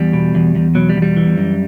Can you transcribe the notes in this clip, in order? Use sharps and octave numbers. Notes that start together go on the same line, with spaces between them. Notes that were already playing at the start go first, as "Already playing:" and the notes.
Already playing: E2 G3
B2
E2
E2
B2 F#3
G3
E2
G3
E3
F#2